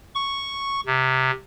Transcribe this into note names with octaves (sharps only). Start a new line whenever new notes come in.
C#6
C3